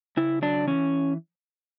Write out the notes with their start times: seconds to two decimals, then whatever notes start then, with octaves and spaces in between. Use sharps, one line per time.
0.17 C#3 E4
0.42 F#3 D4
0.67 E3 C#4